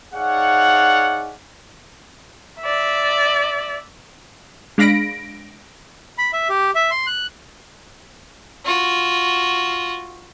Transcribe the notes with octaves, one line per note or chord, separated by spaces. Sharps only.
D#4 G#4 C#5 D5 F5 F#5
D5 E5
G#3 D4 F5 B5 A#6 D7
B5
E5
G4
E5
C6
F#6
F4 F#4